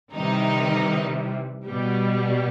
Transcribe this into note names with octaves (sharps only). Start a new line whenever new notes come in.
C3 D#3 E3 G3 D#4
B2 G3